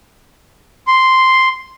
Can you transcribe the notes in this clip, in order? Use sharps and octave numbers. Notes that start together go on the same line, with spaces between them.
C6